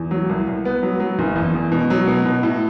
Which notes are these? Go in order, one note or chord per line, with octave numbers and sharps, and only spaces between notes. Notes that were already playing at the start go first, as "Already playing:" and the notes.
Already playing: E2
F#3
C2
C2
B3
F#3
F#3
F#1
E2
E2
B2
F#3
B2
B2
A2